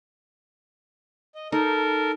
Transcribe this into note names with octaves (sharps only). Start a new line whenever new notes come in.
D#5
D#4 A4 A#4